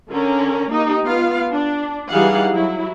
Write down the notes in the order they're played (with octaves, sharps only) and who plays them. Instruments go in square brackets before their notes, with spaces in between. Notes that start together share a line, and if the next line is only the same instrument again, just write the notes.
[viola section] D3 C#4 A#4
A#3 D#4 G4
B3 F4 F5
D4
E3 G3 D#4 G#4 F5 F#5
F#3 E4